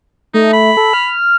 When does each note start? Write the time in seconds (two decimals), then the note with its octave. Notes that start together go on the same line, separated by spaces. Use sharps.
0.34 A3 D#4
0.53 B5
0.77 A4
0.93 F6